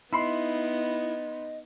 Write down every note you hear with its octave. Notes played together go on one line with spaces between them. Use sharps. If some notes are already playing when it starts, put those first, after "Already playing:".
B3 D#4 E4 D#5 B5 C6 C7